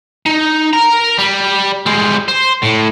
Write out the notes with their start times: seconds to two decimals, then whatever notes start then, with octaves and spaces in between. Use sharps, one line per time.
0.26 D#4
0.73 A#4 A#5
1.18 G3
1.86 G3 G#3
2.28 C5
2.63 A2